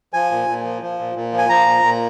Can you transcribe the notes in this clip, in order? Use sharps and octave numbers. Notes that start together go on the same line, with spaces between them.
F3 G#5
A#2
A#2
F3
F3
A#2
A#2
F3
G#5
F3 A#5
A#2
A#2